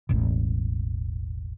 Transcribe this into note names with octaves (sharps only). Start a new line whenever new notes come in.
E1 A1